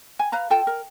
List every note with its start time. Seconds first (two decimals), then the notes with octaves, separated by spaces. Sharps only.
0.19 G#5
0.32 B4 F5 A#5
0.50 F4 A4 G5 A5
0.67 A#4